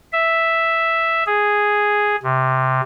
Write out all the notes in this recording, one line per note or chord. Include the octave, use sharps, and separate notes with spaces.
E5
G#4
C3